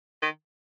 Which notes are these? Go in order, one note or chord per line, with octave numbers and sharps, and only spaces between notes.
D#3